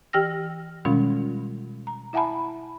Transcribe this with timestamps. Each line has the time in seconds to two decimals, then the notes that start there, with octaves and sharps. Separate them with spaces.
0.13 E3 G4 G5 E6 F6 A#6
0.85 B2 D#3 G3 G#3 C#4 F4
1.87 A#5
2.13 E4 E5 F#5 G#5 A5 B5